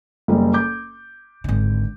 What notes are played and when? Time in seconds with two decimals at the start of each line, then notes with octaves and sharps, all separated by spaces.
0.28 F#1 G3
0.54 D6 G6
1.44 G#1 D3